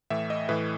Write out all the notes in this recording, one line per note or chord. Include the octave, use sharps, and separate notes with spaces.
A2 E3 E5
D#5
A2 E3 B4